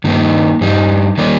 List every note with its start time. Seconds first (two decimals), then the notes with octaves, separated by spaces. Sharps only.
0.04 G2 D#3 A#3 D#4
0.61 G2 G3 D#4
1.18 D#3 G3 A#3